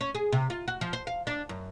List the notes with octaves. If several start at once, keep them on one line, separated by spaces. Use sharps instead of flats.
C#4
G#4
C3
F4
F#4
F3
C5
F5
D4
F#2